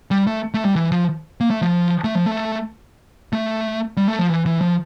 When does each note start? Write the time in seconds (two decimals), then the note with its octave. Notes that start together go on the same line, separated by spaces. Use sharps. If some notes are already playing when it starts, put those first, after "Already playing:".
0.11 G3
0.27 A3
0.54 A3
0.65 G3
0.76 E3
0.92 F3
1.41 A#3
1.51 A3
1.62 F3
2.04 A3
2.15 F3
2.26 A3
3.33 A3
3.97 G3
4.08 A3
4.19 F3
4.29 E3
4.46 E3
4.61 F3